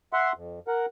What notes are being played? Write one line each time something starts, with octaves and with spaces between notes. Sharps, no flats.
E5 F#5 C6
F2
A#4 F#5